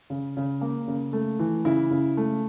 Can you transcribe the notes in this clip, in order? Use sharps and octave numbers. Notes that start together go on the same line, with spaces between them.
C#3
C#3
A#3
C#3
A3
E3
C#3 E4
C#3
A3